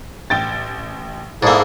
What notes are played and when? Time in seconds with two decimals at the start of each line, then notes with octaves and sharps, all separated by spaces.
0.30 A1 G5 A6
1.43 G#2 A#3 E4 G#4 A4 D5